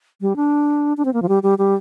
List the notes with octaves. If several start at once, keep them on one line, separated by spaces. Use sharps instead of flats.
G3
D4
D4
C4
A#3
F3
G3
G3
G3